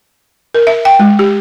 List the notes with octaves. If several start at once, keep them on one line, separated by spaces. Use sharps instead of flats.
A#4
E5
G5
G#3
G4